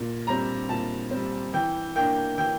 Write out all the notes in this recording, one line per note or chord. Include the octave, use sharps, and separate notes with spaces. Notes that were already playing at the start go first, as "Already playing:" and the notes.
Already playing: A#2
G3 C4 A#5
A#2 A5
G3 C4
E3 G5
A#3 D4 G5
E3 G5